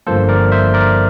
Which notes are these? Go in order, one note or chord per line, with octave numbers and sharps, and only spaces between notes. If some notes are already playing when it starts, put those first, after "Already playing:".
G1 G2 F3 A#3 A4 C5
A#4 D5
C5 E5
A#4 D5